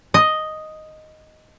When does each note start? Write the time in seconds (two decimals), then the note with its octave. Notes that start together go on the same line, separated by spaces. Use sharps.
0.14 D#5